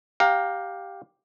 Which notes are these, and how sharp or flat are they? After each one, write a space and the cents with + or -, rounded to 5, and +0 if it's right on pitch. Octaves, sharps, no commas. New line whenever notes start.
G4 +0 F5 +20 A#5 +0